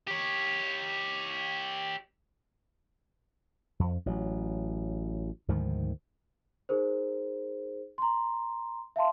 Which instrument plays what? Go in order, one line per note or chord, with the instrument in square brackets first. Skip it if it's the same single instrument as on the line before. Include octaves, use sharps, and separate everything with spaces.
[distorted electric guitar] G4 C#5
[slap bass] F2 F3
A1 F#3
D2 G#2 D#3 F3
[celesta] D#4 G#4 A#4 C5
A#5 C6
E5 F5 A5 C6